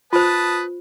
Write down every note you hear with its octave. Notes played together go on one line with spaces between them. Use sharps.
F4 B4 C5 A5 D#6